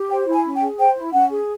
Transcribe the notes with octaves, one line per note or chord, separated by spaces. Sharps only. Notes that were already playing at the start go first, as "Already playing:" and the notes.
Already playing: G4
C5 G5
E4
G#5
C#4
G5
G#4
C5 G5
E4
C#4 F#5
G#4